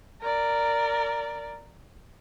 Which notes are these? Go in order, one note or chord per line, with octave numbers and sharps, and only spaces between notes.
A#4 D5